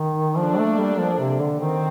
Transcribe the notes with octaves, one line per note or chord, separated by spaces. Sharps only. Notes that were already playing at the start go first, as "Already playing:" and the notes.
Already playing: D#3
F3 A#3 D4 A4
A3
G3
F3
C3
D3
D#3 C4